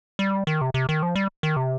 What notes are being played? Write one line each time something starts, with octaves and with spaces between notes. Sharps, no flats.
G3
D#3
C3
C3
D#3
F3
G3
D#3
C3